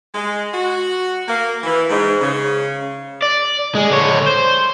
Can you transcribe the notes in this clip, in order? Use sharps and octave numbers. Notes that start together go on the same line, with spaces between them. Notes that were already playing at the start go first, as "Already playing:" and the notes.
G#3
F#4
A#3
E3
G#2
C#3
D5
G#3 G#4
D3 C#5
C5